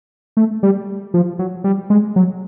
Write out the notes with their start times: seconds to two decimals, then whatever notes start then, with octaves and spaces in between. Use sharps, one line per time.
0.37 A3
0.63 G3
1.14 F3
1.39 F#3
1.64 G3
1.90 G#3
2.16 F#3